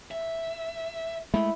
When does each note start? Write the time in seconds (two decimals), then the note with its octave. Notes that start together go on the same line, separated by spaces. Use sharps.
0.11 E5
1.34 G#3 A3 E4